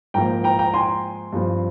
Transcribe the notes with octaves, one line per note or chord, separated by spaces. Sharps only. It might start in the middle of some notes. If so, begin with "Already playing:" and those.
G#2 F3 A#3 G5 A#5
G5 A#5
G5 A#5
G#5 C6
G2 F3 C4